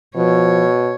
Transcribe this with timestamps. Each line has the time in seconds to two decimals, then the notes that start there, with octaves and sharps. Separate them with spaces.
0.16 B2 F3 C#5